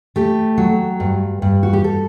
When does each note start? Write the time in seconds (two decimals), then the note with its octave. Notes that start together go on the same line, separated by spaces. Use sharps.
0.16 A3 G4
0.58 F#3
1.00 G2
1.42 G2
1.63 F#4
1.73 G4
1.84 A4